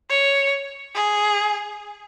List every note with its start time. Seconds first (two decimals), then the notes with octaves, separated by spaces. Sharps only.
0.10 C#5
0.95 G#4